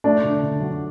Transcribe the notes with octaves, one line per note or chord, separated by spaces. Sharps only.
A3 D4
D3
D3
F#3